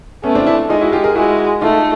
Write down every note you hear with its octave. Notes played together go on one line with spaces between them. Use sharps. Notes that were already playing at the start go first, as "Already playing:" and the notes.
A3 B3 C#4
C4 D4
F4
D4 E4
G#3 D#4 F4
E4 F#4
F4 G4
G#4 A#4
G#3 E4 F#4
A3 D#4 F4